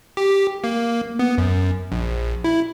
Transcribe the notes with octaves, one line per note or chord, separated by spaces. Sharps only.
G4
A#3
B3
F#2
A#1
E4